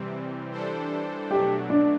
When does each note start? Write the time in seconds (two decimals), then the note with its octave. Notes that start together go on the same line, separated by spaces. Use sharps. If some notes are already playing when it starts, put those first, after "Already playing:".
Already playing: C3 E3 G3 C4
0.52 E3 G3 D4 A4 C5
1.31 B2 F#3 A3 D4 G4
1.70 D4